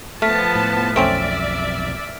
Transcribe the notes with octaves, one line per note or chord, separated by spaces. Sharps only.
F3 A3 B3 A5 F6 B6
A2
B1 F2 A3 C4 C#4 D5 E5 D7